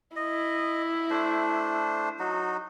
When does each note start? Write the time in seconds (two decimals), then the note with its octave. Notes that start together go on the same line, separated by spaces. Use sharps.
0.16 E4 D#5
1.10 A3 D4 C5
2.19 F#3 D#4 F#4